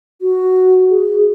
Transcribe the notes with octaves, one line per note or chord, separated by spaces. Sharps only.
F#4
G#4